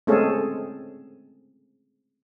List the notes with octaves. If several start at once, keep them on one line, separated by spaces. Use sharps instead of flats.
G#3 A3 C4 C#4 G#4 A4